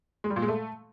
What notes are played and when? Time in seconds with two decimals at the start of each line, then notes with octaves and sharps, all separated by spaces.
0.24 G#3
0.30 G3
0.36 A#2
0.42 G#3
0.48 A3